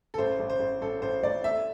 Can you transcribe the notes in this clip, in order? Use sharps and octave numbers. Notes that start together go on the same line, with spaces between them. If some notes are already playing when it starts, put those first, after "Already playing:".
A4
A1 C5
A1
C5
A1
A1 A4
A1 C5
A1 D5
A3 E5